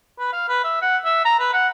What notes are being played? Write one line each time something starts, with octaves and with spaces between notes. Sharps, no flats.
B4
F5
B4
E5
F#5
E5
A#5
B4
F#5